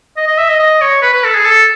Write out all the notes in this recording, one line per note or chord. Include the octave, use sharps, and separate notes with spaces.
D#5
D#5
E5
D#5
D#5
C#5
B4
B4
A4
G#4
A4